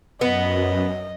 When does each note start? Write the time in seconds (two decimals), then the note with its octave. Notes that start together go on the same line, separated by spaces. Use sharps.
0.21 F#2 B3 D#5